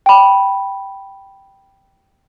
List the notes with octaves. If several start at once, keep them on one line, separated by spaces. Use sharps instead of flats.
G5 B5